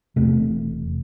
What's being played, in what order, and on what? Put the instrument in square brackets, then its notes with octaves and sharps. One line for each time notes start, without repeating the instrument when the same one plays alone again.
[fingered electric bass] E1 E2 C3 A3 C4